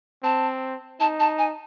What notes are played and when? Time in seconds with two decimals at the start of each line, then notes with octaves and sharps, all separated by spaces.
0.23 C4 A5
1.00 D#4 A5
1.20 A5
1.38 G#5